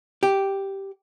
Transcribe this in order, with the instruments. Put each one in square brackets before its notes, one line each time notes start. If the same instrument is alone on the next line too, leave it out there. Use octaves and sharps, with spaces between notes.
[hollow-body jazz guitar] G4